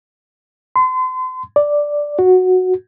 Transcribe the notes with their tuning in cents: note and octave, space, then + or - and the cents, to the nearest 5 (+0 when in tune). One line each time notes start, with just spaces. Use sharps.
C6 -35
D5 +0
F#4 -5